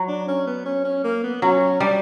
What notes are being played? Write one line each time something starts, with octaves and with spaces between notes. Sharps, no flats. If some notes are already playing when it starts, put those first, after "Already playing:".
Already playing: F#3
D4
C#4
B3
C#4
C#4
A#3
B3
F#3 C#4
G3 D4